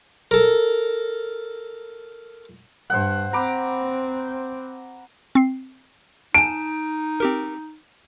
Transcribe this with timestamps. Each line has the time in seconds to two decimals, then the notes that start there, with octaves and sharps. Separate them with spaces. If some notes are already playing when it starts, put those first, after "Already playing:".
0.31 A4 A#4
2.90 G2 C5 F#5
3.33 C4 A#5 B5 D6
5.35 C4 C7
6.34 D#4 G#5 A5 D7
7.20 C4 G4 A#4